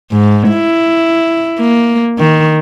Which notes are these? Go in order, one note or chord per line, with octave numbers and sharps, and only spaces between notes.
G#2
E4
A#3
D#3